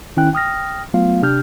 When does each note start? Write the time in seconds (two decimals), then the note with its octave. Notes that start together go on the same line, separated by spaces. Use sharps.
0.17 D#3 C#4 E4 G5 F#6
0.33 G5 D#6 F6 A#6
0.94 F#3 A3 B3 F4 F5
1.22 C3 D4 G4 F6 G6